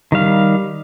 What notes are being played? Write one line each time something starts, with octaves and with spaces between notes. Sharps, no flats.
D#3 G3 F5